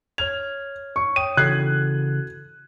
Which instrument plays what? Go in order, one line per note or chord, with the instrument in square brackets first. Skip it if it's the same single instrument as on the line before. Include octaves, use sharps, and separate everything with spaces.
[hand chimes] C#5 F6 G#6 [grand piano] F7
[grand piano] C#6
[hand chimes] C#5 G5 D#6 [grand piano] D#7
[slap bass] C#3 E3 [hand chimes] F#4 A4 [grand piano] F#6 G#6 C7